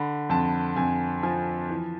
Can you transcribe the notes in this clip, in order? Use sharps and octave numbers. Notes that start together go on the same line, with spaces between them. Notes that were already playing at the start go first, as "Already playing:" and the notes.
Already playing: D3 B5
F2 A5
F2 G#5
F3 G#5
E3